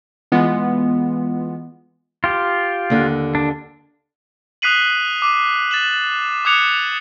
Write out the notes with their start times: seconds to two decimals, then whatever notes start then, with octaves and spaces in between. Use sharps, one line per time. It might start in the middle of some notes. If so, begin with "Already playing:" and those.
0.32 E3 G#3 B3 F4
2.24 F4 G4
2.90 D#2 D3
3.35 D4
4.62 D#6 F#6 B6 C7 D#7 F#7
5.22 D6 D#7
5.71 A6 E7 F#7
6.45 D6 D#6 F#6 G#6 C#7 F7